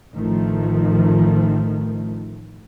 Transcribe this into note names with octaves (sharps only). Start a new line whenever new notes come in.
A1 D#3 F3 A3